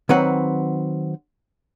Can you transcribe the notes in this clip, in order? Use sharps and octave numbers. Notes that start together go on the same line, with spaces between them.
D#3 F#3 C4 B4 F#5